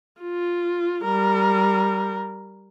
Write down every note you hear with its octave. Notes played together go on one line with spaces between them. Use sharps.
F4
G3 A#4